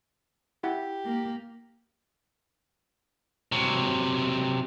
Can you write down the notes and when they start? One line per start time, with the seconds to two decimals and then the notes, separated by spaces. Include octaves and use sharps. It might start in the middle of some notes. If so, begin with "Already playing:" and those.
0.64 E4 G4 F#5
1.05 A#3
3.52 C3 F#3